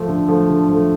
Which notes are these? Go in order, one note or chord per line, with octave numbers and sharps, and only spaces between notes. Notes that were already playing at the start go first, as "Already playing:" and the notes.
Already playing: F3 A3
D3
F3 A3
D3
F3 A3